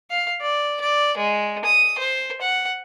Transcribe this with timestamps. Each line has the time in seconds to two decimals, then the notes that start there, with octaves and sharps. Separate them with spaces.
0.10 F5
0.41 D5
0.81 D5
1.17 G#3
1.65 D#6
1.98 C5
2.41 F#5